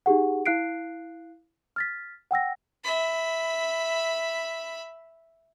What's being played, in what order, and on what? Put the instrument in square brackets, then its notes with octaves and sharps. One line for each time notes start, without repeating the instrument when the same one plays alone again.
[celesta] D#4 G4 G#4 F#5
E4 F5 F#6 C7 D7
F6 A6 B6
F#5 G5 E6 A#6
[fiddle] E5 B5